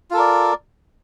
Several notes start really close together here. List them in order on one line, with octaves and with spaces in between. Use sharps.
F4 A4 A#4 D5